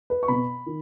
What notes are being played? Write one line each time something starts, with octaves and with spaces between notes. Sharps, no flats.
B4
C#6
B2 B3 B5
D#3